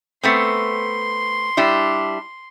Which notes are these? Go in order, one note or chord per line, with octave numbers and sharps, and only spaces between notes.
A3 B3 C4 C6
G3 D4 E4